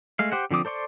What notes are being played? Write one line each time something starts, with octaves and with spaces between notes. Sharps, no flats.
G#3 A3 F5
G4 C5 F#5
D3 F3 C4 D6 D#6
A4 C5 D5 C6 C#6